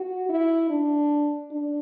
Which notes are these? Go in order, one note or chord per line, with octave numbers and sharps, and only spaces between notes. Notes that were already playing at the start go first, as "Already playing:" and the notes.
Already playing: F#4
E4
D4
D4